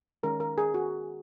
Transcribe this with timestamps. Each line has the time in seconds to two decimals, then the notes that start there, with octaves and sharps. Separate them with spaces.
0.23 D#3 G#3 C#4 A#4
0.40 A#4
0.58 G#4
0.74 F#4